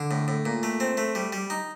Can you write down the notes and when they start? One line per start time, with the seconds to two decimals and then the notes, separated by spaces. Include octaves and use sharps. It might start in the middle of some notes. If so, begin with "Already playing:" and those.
Already playing: D3
0.11 A2
0.28 A2
0.45 A#2
0.63 A3
0.80 C4
0.97 A3
1.15 G3
1.33 G3
1.50 D#4